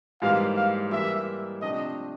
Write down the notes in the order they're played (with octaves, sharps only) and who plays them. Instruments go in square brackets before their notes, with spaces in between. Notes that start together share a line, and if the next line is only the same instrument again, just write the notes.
[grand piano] G#2 E3 G3 A#3 [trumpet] F5
[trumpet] F5
[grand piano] E3 G3 A#3 [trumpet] E5
[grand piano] C3 F3 A3 D4 G4 [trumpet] D#5